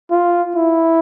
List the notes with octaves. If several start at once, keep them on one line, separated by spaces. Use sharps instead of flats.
F4
E4